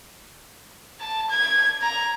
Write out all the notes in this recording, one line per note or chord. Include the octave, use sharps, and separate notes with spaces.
A5
G#6
A#5